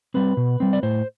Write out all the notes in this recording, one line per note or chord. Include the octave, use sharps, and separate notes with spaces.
G3 C4 B4
B2
G3 C4
D5
A2 C5